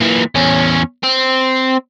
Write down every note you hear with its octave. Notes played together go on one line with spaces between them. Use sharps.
A#2 E3
E2 C#4
C4